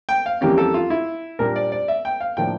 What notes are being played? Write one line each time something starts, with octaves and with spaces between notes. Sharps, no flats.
G5
F5
F2 E3 G3 A#3 C#4 G4
A4
F4
E4
A#2 G3 D4 A#4
D5
D5
E5
G5
F5
A2 F3 A#3 D4 G5